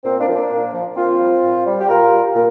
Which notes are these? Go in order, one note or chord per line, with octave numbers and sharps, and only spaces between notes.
A#2 C4
A#3 D4
F3
A#3 D4
A#2
F3
A#2 C4 F4
G3
A#2
G3
G4
A#2 F4 A#4
G3
A#2